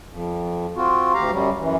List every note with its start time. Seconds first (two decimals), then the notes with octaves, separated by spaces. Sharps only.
0.09 F2
0.76 C4 F4 F#4
1.14 D2 G4 F5 A#5
1.31 F#2 F#3 G3
1.60 F#2 E3